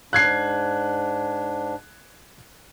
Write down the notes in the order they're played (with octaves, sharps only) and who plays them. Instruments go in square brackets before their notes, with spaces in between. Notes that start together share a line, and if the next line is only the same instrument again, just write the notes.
[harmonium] G#2 D4 [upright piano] F#6 G#6 C7